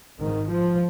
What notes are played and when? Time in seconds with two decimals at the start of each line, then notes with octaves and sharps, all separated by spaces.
0.19 G#1 G#2 D#3
0.47 F3